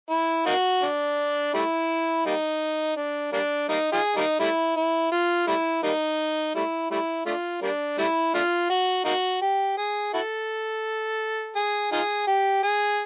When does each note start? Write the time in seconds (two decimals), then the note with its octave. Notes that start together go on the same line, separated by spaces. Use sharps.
0.11 E4
0.47 A#3 D#4 F#4
0.83 D4
1.54 G3 A3 E4
2.26 G3 A#3 D#4
2.96 D4
3.33 G3 A#3 D4
3.69 G3 A#3 D#4
3.92 D#4 F4 G#4
4.16 G3 A#3 D#4
4.40 G3 A3 E4
4.77 E4
5.12 F4
5.47 G3 A3 E4
5.83 G3 A#3 D#4
6.56 G3 A3 E4
6.91 G3 A3 E4
7.26 A3 D4 F4
7.62 G3 A#3 D4
7.98 G3 A3 E4
8.34 A3 D4 F4
8.70 F#4
9.05 A#3 D#4 F#4
9.41 G4
9.77 G#4
10.14 E4 F#4 A4
11.56 G#4
11.92 D#4 F4 G#4
12.27 G4
12.64 G#4